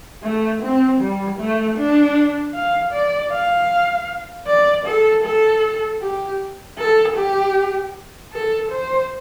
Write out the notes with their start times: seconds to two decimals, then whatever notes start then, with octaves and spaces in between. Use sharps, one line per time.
0.23 A3
0.62 C4
1.01 G3
1.39 A3
1.78 D4
2.55 F5
2.93 D5
3.32 F5
4.47 D5
4.86 A4
5.24 A4
6.02 G4
6.78 A4
7.16 G4
8.32 A4
8.71 C5